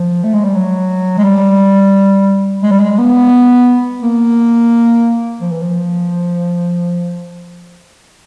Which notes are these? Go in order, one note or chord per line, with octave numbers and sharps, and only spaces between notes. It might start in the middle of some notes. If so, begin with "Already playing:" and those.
Already playing: F3
A3
G#3
G3
F#3
G#3
G3
G#3
G3
G#3
B3
A#3
F3
E3
F3